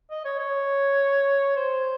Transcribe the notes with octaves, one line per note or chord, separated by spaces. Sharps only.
D#5
C#5
C#5
C5